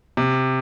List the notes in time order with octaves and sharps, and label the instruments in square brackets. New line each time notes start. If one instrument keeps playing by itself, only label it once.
[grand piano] C3